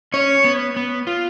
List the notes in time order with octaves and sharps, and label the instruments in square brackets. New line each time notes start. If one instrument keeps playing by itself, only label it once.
[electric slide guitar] C#4 [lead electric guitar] C#5
[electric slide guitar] B3
B3
F4